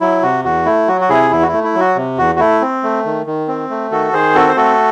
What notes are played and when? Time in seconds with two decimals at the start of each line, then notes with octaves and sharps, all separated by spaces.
0.01 F#3 E4
0.22 C3 F#4
0.44 E2 F#4
0.66 A3 E4
0.88 F#3 F#4
1.01 F#4
1.09 C3 E4 G#4
1.31 E2 E4
1.43 F#4
1.47 A3 E4
1.64 E4
1.74 F#3
1.80 F#4
1.96 C3
2.18 E2 F#4
2.35 F#4
2.40 A3 E4
2.61 C4
2.83 A3
3.05 D#3
3.26 D#3
3.48 C4
3.70 A3
3.91 D#3 F#4 A4
4.13 D#3 G#4 C5
4.35 C4 F#4 A4
4.48 C5
4.56 A3 F#4 A4